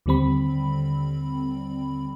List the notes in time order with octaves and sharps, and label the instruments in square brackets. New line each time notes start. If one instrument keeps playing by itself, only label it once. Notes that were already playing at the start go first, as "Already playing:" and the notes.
[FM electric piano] D#2 D3 G3 C4 B5